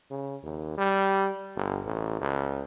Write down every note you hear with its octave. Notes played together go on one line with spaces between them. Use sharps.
C#3
D#2
G3
G1
A1
C#2